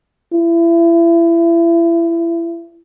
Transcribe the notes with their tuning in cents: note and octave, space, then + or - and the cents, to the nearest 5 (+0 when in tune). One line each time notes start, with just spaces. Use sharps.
E4 +30